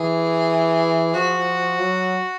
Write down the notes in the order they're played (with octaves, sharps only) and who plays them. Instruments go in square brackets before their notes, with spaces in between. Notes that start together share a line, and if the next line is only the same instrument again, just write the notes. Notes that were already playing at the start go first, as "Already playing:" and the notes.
Already playing: [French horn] E3 [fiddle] G#4
[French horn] F3 [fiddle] F#4
[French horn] F#3